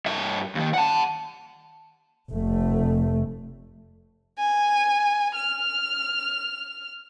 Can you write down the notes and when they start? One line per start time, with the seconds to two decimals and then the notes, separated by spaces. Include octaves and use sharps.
0.06 G2 E5
0.55 D#2 D#3
0.74 F#5 A5
2.31 F1 A3
4.39 G#5
5.36 F6